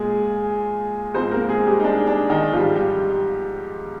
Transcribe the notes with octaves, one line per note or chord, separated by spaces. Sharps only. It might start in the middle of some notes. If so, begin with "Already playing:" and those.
Already playing: A#2 G#3 G#4
G#2 F3 G#3 C4 C5
A#3 A#4
G#3 G#4
G3 G4
D#4
D4
D4
D#3 D#4
G#2 F3 G3 F4
G3 G4